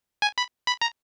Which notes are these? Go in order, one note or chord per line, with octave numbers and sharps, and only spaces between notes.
G#5
B5
B5
A#5